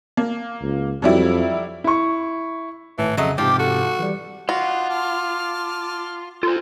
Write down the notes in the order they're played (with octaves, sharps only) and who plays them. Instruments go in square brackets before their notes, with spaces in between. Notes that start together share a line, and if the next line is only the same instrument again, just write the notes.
[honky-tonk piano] A#3
[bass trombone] C#2
[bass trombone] F2 [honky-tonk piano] F#3 G3 E4
[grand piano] E4 C#6
[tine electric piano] G#1 A2 A5 [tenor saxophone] E3
[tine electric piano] F2 C#3 [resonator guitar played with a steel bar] F#3 D#5 [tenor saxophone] A3
[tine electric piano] G#2 C3 [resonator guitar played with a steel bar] F3 [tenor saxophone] G4 [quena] D6
[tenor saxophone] F#4 [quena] A4
[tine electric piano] E3 G3
[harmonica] D4 D#4 [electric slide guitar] F4 [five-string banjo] F#4
[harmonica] A5 D6 F6
[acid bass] F4 [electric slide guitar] A4 A#4 C5